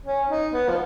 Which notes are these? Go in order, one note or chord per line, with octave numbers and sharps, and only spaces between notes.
C#4
D#4
B3
F3